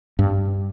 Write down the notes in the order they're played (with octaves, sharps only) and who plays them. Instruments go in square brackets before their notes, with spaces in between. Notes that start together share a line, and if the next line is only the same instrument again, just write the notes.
[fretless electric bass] G2